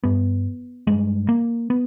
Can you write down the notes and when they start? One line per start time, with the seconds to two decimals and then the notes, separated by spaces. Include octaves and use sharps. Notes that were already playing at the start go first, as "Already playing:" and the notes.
0.03 G2 B3
0.87 G2 G#3
1.29 A#3
1.70 B3